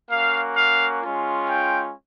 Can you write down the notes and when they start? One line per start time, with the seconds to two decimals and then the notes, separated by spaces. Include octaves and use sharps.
0.11 A#3 C#4 F#4 F5
0.57 F5
1.02 G#3 C#4 F4
1.48 G5